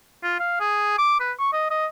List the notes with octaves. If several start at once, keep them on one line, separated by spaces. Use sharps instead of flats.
F4
F5
G#4
D6
B4
C#6
D#5
D#5